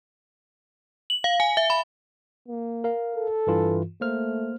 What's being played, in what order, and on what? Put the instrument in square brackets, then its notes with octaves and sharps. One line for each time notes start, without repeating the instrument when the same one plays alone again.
[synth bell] F#7
F5
G#5
E5
B5
[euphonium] A#3
[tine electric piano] A#4 F5
[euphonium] A4
[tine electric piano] G2 E3 F4
[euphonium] A3 [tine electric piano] A#3 C5 F6